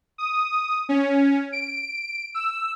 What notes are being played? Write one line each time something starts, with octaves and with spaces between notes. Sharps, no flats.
D#6
C#4
D7
E6